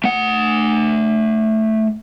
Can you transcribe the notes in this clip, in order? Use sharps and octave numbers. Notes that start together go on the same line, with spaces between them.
A3 F#5